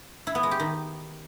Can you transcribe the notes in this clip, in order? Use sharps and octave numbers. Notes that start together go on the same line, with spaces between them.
E4
B3
G#3
G4
D#3